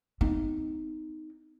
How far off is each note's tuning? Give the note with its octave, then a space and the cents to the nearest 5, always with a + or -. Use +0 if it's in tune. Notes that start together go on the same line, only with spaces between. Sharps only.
C4 -45 D#4 +0